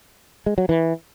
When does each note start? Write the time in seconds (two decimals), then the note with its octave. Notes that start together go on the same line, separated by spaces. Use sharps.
0.46 G#3
0.58 F#3
0.69 E3